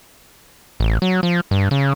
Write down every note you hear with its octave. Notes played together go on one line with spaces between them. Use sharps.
A1
F#3
F3
G2
C#3